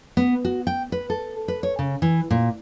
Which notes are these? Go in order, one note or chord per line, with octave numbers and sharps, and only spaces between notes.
B3
F#4
G5
B4
A4
B4
C#5
C#3
E3
A#2